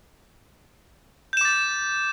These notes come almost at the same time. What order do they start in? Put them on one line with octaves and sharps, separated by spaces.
G6 E7 D6 A6